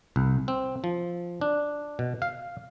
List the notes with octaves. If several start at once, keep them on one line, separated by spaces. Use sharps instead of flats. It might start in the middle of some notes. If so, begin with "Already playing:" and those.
C2
C4
F3
D4
B2
F5